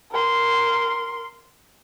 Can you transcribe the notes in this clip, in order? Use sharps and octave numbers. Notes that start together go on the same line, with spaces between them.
A#4 C6